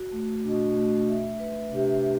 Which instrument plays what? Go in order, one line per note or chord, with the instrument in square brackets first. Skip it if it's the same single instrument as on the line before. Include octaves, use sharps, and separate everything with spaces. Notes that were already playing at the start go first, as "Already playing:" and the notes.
Already playing: [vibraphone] F#4
A3
[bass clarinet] B2 [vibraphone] D4
[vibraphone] A3
E5
B4
[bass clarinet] C3 [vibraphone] D4